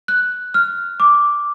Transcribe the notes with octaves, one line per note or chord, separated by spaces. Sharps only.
F#6
F6
D6